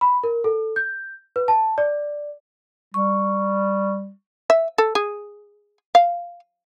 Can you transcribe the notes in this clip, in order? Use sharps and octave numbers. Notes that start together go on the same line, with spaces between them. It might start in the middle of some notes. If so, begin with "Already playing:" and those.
B5
A#4
A4
G6
B4
A5
D5
G3 C#6
E5
A4
G#4
F5